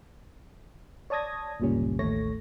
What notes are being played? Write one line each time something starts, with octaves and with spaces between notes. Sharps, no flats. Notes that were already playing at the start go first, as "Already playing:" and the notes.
C#5 D5 A5 D#6 G#6 A#6
G1 C#2 A#2 G3 C#4
A1 D#2 A3 C#5 A#6